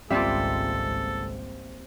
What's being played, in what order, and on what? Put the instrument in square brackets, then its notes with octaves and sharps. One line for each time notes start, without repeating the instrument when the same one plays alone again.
[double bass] G#1 C#2 [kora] G3 A#3 F4 [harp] C4 E5 [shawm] A4